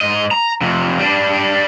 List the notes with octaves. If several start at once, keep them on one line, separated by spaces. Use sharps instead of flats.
G#2 D#5
A#5
F2 C3
G3 D4